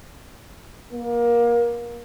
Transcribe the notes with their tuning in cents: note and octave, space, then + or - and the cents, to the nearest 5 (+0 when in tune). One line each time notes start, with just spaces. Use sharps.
A#3 +25